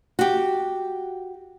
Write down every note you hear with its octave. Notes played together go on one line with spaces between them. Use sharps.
F#4 G4